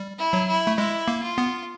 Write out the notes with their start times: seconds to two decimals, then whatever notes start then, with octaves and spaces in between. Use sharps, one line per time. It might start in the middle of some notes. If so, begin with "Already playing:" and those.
Already playing: G3
0.18 E4
0.33 F#3
0.48 E4
0.67 A3
0.78 G#3 E4
1.08 A#3
1.23 F4
1.38 B3